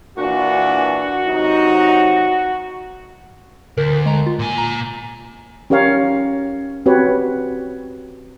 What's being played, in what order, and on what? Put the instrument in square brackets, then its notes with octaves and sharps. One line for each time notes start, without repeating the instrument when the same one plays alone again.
[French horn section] A#2 E3 D4 [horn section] F#4
[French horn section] C3 F#3 D#4
[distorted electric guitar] D2 [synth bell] A#4
[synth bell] G#3 A#5
F4
[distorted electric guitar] A#2 G#5
[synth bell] A#5
[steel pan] C#4 G4 A#4 C#5 F5
C4 F#4 G4 B4 C#5